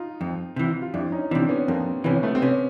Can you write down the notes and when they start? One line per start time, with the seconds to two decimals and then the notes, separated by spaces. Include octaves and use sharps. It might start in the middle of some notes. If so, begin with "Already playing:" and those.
Already playing: D#4 F4
0.21 F2
0.56 C3 E3
0.82 F4
0.94 F2 D4 E4
1.12 C#4 D#4
1.31 C3 E3 C4 D4
1.49 B3 C#4
1.68 F2 A#3 C4
2.04 C3 E3 B3 C#4
2.23 A3 B3
2.35 C4
2.42 C3 B3 C#4